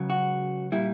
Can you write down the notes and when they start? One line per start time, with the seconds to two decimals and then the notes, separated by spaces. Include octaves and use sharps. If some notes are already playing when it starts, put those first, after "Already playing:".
Already playing: C#2 C#3 F#3
0.10 F#4
0.72 A#2 G3 E4